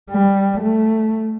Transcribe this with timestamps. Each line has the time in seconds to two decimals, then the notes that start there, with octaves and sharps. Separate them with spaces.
0.11 G3
0.61 A3